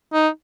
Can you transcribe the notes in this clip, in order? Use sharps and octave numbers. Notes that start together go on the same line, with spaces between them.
D#4